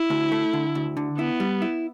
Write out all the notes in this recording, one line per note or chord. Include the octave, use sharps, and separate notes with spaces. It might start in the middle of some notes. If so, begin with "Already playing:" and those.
Already playing: E4
D2
A3
D3
D2
D3
B3 E4
G3
E4